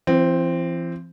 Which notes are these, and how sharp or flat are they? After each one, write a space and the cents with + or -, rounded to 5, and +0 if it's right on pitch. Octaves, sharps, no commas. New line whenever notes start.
E3 +45 C4 +0